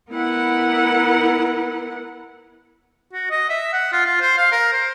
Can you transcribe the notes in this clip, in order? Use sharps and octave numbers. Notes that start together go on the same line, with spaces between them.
B3 E4 A#4 F#5
F#4
D#5
E5
F#5
F4
F4
C5
F5
A#4
C5